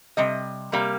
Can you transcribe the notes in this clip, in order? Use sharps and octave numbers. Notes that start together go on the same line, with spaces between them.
C3 G3 D#5
C3 G3 A#3